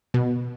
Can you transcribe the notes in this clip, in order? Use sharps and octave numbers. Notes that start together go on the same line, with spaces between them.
B2